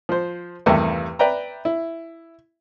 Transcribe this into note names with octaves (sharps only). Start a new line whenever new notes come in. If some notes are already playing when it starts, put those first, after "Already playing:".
F3 C5
E2 G2 C3 D#3 A3
B4 D5 E5 G5 A#5
E4